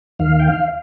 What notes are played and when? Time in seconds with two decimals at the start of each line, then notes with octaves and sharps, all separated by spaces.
0.19 D#2 D#3 F5
0.39 G5
0.48 F5